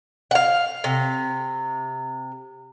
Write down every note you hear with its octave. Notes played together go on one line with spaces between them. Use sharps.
F5 F#5
C3